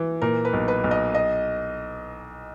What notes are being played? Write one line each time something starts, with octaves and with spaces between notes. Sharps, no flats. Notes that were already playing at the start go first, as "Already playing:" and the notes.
Already playing: E3
A#2 A#4
B4
B1
B4
B1
D#5
D#5